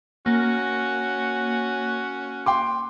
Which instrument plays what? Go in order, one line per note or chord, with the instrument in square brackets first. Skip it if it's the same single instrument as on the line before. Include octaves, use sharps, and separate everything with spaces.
[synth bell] A#3 [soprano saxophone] C#4 [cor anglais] F#4
[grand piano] G5 C6 D6